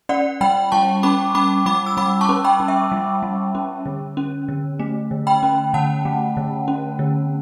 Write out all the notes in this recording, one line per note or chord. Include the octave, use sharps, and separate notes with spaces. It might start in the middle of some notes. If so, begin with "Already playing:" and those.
C#4 D5 F#5
G3 G5 B5
G3 A5 C#6
C#4 B5 D6
C#4 B5 D6
G3 B5 D6
E6
G3 B5 D6
A5 C#6
C#4
G5 B5
C#4
E5 G5
G3
G3
C#4
D3
C#4
D3
A3
D3
G5 B5
C#4
D3 F#5 A5
A3
D3
C#4
D3